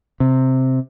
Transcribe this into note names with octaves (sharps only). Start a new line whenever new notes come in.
C3